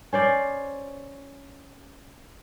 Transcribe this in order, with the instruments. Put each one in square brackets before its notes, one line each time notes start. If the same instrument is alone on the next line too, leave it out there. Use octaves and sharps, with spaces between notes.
[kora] C#4 C5 D5